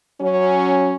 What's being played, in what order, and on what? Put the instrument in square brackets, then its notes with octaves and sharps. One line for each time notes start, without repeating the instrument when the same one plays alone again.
[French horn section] F#3 C#4